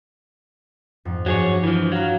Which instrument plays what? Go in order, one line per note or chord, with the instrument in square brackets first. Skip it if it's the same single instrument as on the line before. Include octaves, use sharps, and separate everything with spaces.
[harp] F2 G#2
[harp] G2 D4 [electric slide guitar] F#3 G#4 C#5
[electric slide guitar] E3 F3
[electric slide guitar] F#3 [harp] F5 A#5